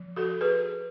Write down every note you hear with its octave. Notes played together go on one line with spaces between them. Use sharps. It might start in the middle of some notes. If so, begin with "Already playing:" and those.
Already playing: F3
F#4 A4
G#4 B4